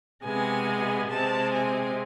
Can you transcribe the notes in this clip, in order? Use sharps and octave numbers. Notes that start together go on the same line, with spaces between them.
C3 G#3 B3 G#5
C3 G#3 C4 A5
G#5